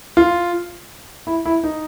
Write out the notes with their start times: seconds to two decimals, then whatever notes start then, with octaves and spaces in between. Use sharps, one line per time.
0.17 F4
1.27 E4
1.46 E4
1.64 D#4